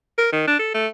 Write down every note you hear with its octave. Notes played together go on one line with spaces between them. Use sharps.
A#4
D#3
D4
A4
A3